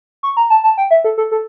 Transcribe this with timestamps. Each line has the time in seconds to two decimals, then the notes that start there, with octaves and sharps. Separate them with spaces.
0.23 C#6
0.37 A#5
0.50 A5
0.64 A5
0.78 G5
0.91 E5
1.04 A4
1.18 A4
1.31 A4